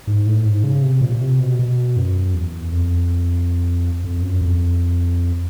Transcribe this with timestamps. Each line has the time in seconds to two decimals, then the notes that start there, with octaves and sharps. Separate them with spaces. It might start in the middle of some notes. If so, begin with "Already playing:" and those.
0.07 G#2
0.27 A2
0.45 G#2
0.64 C#3
0.82 C3
1.01 A#2
1.21 C3
1.40 B2
1.59 B2
1.97 F#2
2.34 E2
2.72 F2
4.04 F2
4.22 F#2
4.41 F2